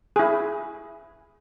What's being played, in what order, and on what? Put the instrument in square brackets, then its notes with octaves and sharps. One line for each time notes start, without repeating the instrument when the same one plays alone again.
[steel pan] E4 G#4